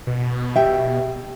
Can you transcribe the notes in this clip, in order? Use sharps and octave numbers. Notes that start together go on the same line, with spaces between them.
B2
G4 E5 G5